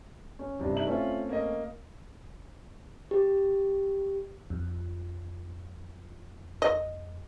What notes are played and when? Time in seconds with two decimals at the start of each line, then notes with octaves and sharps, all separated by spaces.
0.39 C#4
0.59 G2 C3
0.72 D#4 E5 F#7
0.87 A3 C4 C#4 F4 E5
1.29 A#3 D#5
3.11 G4
4.50 F2
6.62 D#5